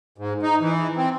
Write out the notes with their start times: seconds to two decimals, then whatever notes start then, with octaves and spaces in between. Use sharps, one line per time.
0.18 G#2
0.43 D#4
0.61 E3
0.97 C4